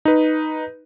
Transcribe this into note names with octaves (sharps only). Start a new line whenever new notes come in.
D#4 B4